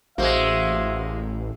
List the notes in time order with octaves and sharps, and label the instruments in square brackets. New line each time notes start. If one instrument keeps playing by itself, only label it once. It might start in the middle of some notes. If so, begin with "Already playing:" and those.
[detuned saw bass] A1 [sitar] G#3 A#3 [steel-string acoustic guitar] F#4 C5 [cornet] E5